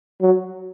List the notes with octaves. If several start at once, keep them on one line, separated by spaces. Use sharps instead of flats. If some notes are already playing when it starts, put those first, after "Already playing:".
F#3